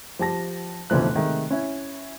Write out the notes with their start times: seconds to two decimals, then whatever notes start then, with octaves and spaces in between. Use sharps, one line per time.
0.19 F3 G4 A5 A#6
0.90 F1 D2 B2 E3 F3 F#6
1.15 C3 D#3 G#3 A3
1.50 C#4 E4